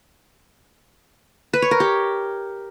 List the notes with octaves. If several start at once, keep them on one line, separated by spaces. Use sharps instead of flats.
B4
C#5
A#4
G4